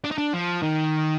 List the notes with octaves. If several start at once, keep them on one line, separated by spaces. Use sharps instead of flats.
D4
D#4
D4
F3
D#3